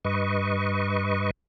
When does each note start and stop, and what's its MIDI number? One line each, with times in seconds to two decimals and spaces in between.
0.05 1.31 43
0.05 1.31 71
0.05 1.31 75
0.05 1.31 85